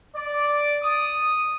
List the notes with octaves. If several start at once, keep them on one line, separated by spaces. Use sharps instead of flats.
D5
D#6